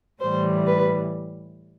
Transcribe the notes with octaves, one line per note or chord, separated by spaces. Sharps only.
A2 E3 G3 C5
B4